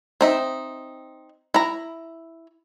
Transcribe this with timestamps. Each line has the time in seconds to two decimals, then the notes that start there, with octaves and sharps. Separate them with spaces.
0.21 C4 D#4 E5
1.54 E4 A#5